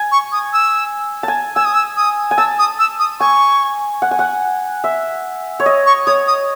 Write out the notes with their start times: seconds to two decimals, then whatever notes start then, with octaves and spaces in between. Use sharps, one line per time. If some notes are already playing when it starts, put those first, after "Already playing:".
Already playing: G#5
0.12 C#6
0.32 D#6
0.53 E6
1.23 G#5 A5
1.56 G#5 E6
1.65 D#6
1.74 E6
1.97 D#6
2.31 G#5
2.37 A5 E6
2.59 D#6
2.79 E6
3.00 D#6
3.20 G#5 C#6
4.02 F#5
4.11 G#5
4.19 F#5
4.84 E5
5.60 C#5
5.66 D#5
5.86 C#6
6.06 C#5 D#6
6.27 D#6